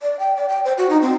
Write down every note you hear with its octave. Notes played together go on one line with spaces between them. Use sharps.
D5
G5
D5
G5
C5
F#4
D#4
C4